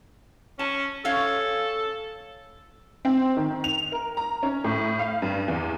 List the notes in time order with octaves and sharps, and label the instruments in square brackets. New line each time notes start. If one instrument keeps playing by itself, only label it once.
[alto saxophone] C#4 [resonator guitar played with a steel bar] A5
[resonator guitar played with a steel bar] C#4 C#5 F5 [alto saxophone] A4
[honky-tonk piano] C4
D#3
F7
A#4
A#5
C#4
A2
F5
G2
E2